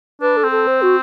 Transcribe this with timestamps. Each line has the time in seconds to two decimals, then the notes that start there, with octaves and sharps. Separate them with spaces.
0.21 D4 B4
0.37 A4
0.44 C4
0.52 A4
0.67 C5
0.82 F#4